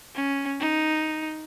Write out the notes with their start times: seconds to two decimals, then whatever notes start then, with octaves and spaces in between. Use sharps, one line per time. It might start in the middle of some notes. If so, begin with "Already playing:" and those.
0.15 C#4
0.60 D#4